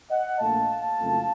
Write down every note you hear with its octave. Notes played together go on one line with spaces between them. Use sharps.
D#5 F#5
A#1 A#2 A3 F5 A5
F#1 F2 C#3 A3